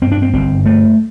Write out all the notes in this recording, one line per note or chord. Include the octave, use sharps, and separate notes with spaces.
G2 C4
D4
C4
G1 C4
G2 A3